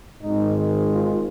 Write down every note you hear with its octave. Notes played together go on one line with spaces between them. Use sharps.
G#1 G#2 D#3 G#3 D#4
F4